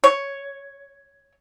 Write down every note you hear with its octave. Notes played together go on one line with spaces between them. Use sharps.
C#5